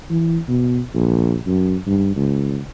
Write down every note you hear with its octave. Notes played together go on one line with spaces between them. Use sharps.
E3
B2
A#1
F#2
G2
C#2